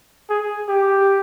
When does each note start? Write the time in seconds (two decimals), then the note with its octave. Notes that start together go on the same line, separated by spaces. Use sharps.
0.29 G#4
0.68 G4